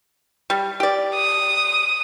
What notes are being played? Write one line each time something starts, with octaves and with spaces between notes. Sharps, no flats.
G3
G4 D5
D#6